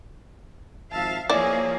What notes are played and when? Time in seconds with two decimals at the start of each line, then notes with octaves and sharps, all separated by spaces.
0.92 G#1 F3 E5 F5 A5
1.30 F3 A#3 E4 G#4 C#5 D5